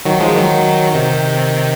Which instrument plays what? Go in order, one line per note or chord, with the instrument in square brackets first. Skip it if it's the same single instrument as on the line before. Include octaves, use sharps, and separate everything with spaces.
[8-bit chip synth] D#3 F#3
F3 G#3
D#3 F#3
C3 D#3